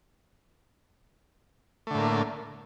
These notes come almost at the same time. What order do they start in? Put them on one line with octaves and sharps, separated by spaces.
A3 D3 A2 A#3